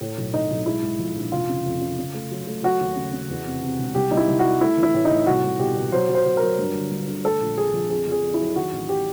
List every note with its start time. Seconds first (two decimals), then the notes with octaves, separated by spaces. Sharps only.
0.01 A2
0.17 B1
0.34 A2 D#4
0.50 B1
0.66 G#3 E4
0.82 G#2
0.99 F3
1.16 A#1
1.32 F1 F4
1.49 C#3
1.66 F2
1.81 C#3
1.98 C#3
2.14 A3
2.31 F#3
2.47 A3
2.63 F#3 F#4
2.81 D#2
2.96 C#3
3.13 C#3
3.30 E2
3.46 C3
3.63 C3
3.78 E1
3.95 C2 G4
4.11 C2 D#4
4.17 E4
4.28 C2
4.39 G3 F#4
4.61 A3 E4
4.77 E3
4.83 E4
4.94 A2
5.05 D#4
5.10 A2
5.27 C2 F#4
5.43 C2
5.59 B2 G4
5.76 B2
5.92 F#3 C5
6.09 F#3
6.15 C5
6.26 F#3
6.37 A#4
6.42 F#3
6.59 G2
6.75 G1
6.91 G1
7.07 D3
7.25 A3 A4
7.41 A#1
7.58 A3 G#4
7.74 F3
7.90 F2 G#4
8.07 F2 G#4
8.23 F2
8.34 E4
8.40 F#3
8.56 D#3 F#4
8.73 A1
8.89 G4